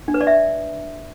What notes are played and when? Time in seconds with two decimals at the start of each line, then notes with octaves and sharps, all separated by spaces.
0.08 D4
0.14 B4
0.21 D5
0.27 E5